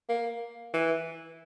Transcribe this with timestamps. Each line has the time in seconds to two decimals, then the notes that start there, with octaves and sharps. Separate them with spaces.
0.09 A#3
0.74 E3